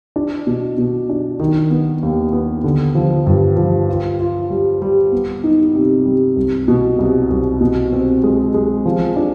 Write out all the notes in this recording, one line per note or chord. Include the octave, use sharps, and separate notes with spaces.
D4
B2
B2
D4
D#3
B3
D#2
B3
D3
F3
G2
F3
F4
F4
G3
G3
B3
D#4
C3
G3
C2
B2
C2
C2
B2
C4
G#3
G#3
F3
D4